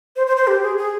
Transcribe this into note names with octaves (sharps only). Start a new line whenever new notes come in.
C5
C5
C5
G4
G#4
G#4